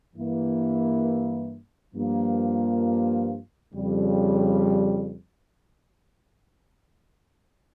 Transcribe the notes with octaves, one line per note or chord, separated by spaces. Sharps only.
G2 E3 A#3 E4
G2 F3 A#3 F4
F2 C#3 G3